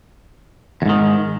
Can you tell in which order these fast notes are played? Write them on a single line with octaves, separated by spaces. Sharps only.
E2 G#2 D#3